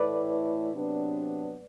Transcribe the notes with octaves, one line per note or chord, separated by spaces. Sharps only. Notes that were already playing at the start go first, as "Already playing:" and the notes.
Already playing: A2 E3 A3 E4 B4 D5
C3 F#3 B3 D4